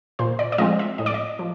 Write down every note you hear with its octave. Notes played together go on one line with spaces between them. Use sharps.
A#2 C5
D5
D5
F3 G#3 C4 D#5
E5
A2 D#5
D5
D#5
F3